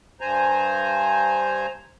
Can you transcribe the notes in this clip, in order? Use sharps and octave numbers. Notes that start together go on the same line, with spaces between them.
G2 C5 G#5 A#5